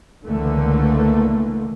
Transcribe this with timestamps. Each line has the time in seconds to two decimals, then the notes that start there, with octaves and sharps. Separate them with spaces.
0.25 C#2 D3 E3 A3 A#3